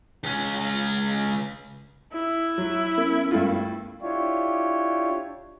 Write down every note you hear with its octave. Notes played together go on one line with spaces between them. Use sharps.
C#2 C#4
E4
F#3
B3 C#4 A#4
G2 A3 F4
D4 E4 F4 G4 C#5